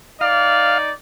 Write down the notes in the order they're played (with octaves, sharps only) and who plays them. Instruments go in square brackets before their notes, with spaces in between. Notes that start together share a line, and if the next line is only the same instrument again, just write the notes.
[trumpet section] D#4 D5 [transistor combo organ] F5